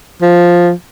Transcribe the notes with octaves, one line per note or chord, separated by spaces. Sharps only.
F3